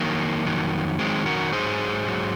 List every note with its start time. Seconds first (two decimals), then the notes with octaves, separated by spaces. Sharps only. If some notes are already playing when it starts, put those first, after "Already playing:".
Already playing: F2 D#3 F#3 A#3
0.45 F2 D#3 F#3
0.99 F2 D#3 F#3 G#3 C4
1.26 F#4 A#4
1.53 G#2 F#3 G#4 C5
2.06 G#2 F#3